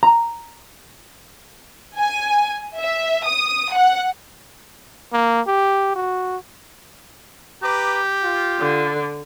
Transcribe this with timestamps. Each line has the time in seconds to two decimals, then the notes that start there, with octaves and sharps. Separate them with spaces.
0.03 A#5
1.98 G#5
2.78 E5
3.25 D#6
3.74 F#5
5.13 A#3
5.47 G4
5.96 F#4
7.63 G4 B4 A#5 D6
8.23 F4
8.60 D3